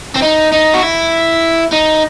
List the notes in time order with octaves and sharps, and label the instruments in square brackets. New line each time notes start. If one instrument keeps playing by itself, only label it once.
[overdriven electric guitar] C4
D#4
D#4
F#4
E4
D#4